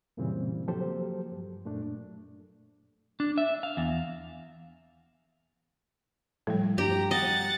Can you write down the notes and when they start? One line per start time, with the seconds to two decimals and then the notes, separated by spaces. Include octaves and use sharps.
0.17 F#2 A#2 C#3 E3 G3 C4
0.68 F3 F#3 A#3 G4 A4 C5
1.31 G2
1.65 F#2 A#2 A3 D4
3.20 D4
3.38 E5
3.63 F5
3.77 E2
6.47 A2 F3 G3
6.78 G2 G4 A#5
7.11 D#5 F#5 A6